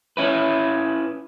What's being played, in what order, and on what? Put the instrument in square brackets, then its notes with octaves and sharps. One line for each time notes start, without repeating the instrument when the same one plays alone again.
[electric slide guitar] C#4 E4 B4